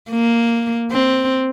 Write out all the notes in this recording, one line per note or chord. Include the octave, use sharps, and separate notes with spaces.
A#3
C4